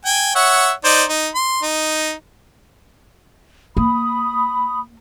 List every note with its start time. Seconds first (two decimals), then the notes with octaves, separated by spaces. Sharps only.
0.05 G5 G#5
0.35 C#5 E5 F#5
0.85 D#4 C5 D5
1.09 D#4
1.35 C6
1.63 D#4
3.77 A#3 B5 D#6